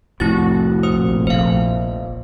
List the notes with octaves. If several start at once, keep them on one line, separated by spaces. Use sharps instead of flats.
C2 F2 A2 E4 F#4 A6
A#1 A#2 C5 D#6
F1 C5 F5